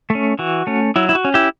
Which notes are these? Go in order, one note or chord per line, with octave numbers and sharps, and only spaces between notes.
A3
C#4
E3 F#4
A3 C#4
F#3 E4
E4
F#4
C#4
E4 G4